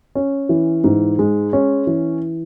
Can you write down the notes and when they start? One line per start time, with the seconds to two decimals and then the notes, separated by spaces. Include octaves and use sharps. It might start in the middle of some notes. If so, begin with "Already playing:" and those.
0.15 C#4
0.49 E3
0.84 G#2
1.19 G#3
1.53 C#4
1.87 E3